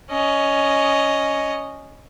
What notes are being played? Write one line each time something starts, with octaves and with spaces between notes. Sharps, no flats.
C#4 D#5